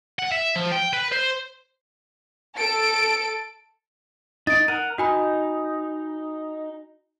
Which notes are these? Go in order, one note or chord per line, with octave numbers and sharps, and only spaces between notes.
F#5
E5
F3
G5
B4
C5
A4 D7
D#4 A6 D7
A#4 F#5 D#7
D#4 F#4 G#5 B5